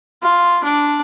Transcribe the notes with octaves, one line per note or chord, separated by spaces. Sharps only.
F4
D4